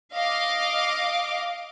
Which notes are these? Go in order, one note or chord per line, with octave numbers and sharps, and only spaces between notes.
D#5 F5 D6